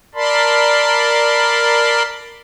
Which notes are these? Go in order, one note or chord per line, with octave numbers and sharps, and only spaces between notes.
A#4 D5 A5 B5 C6